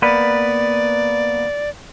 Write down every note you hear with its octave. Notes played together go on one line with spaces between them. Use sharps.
A#3 B3 B4 D5